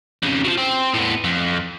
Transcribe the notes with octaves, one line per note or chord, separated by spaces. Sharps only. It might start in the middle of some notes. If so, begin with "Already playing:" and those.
F2 C#3
F3 F#3
C4
A2 B3
F2